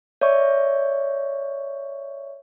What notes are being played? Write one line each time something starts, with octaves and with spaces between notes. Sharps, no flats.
C#5 D5 E5 C#6